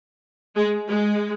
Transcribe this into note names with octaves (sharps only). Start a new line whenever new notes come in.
G#3
G#3